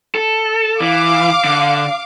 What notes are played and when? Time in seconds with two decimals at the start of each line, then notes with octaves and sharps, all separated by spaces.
0.15 A4
0.81 E3 F5 D6
1.45 D3